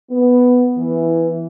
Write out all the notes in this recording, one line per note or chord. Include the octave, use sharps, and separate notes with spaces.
B3
E3